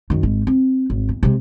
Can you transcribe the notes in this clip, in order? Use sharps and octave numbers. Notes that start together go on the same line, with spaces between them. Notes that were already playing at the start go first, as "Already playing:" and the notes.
F#2 D#3
G#1 G#3
C4
G#1
E2
C3 G#3